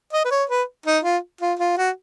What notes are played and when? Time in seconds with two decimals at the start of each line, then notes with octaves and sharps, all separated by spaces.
0.13 D#5
0.25 B4
0.31 C#5
0.50 B4
0.86 D#4
1.04 F4
1.41 F4
1.59 F4
1.77 F#4